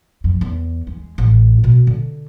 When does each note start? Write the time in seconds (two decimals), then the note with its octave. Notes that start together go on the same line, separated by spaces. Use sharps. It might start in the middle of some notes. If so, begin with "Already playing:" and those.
0.24 F2
0.41 E2
0.87 G#3
1.18 A1
1.64 B2
1.87 D3